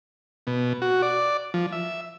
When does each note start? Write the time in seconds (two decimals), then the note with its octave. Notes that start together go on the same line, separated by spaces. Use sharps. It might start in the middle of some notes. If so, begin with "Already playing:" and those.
0.47 B2
0.82 F#4
1.02 D5
1.54 F3
1.72 E5